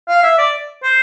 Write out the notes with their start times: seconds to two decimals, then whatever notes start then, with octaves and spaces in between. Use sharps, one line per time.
0.08 F5
0.23 E5
0.38 D5
0.83 C5